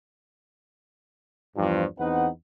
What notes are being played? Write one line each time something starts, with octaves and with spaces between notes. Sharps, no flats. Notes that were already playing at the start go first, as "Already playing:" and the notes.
E2 G2 F3
E2 C4 D#4 B4 F#5